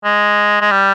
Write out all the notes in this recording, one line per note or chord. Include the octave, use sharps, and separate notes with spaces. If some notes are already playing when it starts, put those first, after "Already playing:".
G#3
G#3
G3